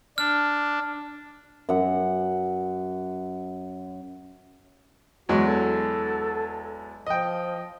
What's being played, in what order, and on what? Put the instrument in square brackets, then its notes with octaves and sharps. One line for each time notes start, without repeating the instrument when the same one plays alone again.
[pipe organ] D4 [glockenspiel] F6
[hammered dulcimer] F#2 F#5
[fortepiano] E2 F#3 G#3 [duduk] F#4
[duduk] A4
[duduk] F3 [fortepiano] D#5 G5